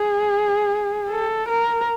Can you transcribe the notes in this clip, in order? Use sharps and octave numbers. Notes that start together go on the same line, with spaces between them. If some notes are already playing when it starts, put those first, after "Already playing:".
Already playing: G#4
A4
A#4